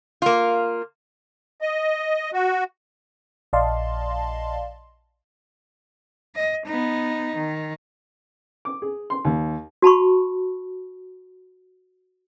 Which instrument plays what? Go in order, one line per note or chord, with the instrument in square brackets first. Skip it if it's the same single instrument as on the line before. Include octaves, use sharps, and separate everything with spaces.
[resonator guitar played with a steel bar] A#3 F4
[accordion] D#5
F#4
[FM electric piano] A#1 D5 D#5 F5 A5 C6
[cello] D#5
B3 D#4
D#3
[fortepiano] D6
G#4
C6
D#2
[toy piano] F#4 A5 B5 C#6